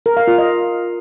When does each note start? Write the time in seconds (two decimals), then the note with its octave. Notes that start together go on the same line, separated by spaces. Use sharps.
0.06 A#4
0.17 F5
0.28 F4
0.38 D#5